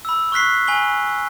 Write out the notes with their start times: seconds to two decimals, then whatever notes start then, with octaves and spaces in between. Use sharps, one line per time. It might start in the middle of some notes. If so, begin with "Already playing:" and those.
0.05 B5 E6
0.32 C#6 F6 F#6 B6 C7
0.68 G#5 B5 G7